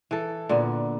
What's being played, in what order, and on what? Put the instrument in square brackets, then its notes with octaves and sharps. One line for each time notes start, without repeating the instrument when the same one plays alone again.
[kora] E3 A4
A#2 D3 B3